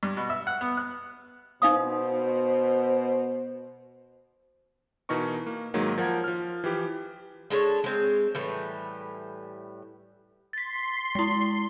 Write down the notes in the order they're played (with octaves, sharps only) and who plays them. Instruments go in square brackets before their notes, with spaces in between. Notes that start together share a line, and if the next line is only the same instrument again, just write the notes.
[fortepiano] G2
B2
E5
F#5
B3
F#6
[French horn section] B2 C5 [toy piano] D#4 F5 D#6
[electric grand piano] B2 E3 D#4 A#4 C#6
A#3
G#2 D#3 F#3 G#3 A#3
F3 A#4 F#5 G#6
F3 F6
E3 F3 G4
[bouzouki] G#3 D4 A4 C#5
G#3 C4
A2 E3 G3
[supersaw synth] C6 C7 [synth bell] A6 B6
[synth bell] G#3 E4